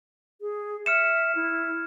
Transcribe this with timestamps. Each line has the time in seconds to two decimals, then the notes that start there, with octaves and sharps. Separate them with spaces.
0.41 G#4
0.86 E5 F6 C#7 E7
1.35 E4